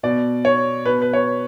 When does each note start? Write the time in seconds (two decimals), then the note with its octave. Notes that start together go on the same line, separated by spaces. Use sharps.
0.03 B2 D5
0.45 C#5
0.86 B2 B4
1.02 B4
1.13 C#5